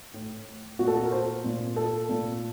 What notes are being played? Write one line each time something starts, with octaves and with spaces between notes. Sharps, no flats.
A2
A#2 F#4
A4
F#4
A#4
C5
A#2
A4
A#2